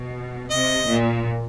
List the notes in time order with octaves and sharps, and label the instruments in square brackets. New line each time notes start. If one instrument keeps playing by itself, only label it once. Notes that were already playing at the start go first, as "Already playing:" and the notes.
Already playing: [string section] B2
[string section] C3 [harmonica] D#5
[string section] A#2